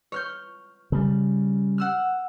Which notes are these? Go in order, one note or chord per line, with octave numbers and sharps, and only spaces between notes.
C#5 F6 G6
C#3 G3
F#5 E6 F6